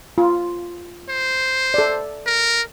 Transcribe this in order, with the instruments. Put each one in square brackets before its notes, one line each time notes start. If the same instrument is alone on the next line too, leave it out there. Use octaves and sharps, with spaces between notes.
[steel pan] F4
[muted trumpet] C5
[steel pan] A4 D5
[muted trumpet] A#4